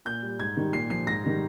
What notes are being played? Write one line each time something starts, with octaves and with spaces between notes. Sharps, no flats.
A#2 G6
G3
G#2 G#6
D#3 G3
A#2 C7
F3 C7
G#2 A#6
D#3 G3